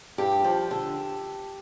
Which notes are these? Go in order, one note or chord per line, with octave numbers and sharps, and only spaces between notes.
G2 G4
F3
D3